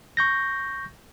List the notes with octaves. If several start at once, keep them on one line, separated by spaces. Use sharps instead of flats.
C#6 G6 A#6